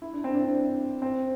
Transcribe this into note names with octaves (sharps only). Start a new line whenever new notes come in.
E4
D4
C4
D4
C4